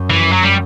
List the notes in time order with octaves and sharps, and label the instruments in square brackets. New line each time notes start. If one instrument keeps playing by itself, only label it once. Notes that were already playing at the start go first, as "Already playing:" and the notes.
Already playing: [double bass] F#2
[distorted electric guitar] E3
F#3
G3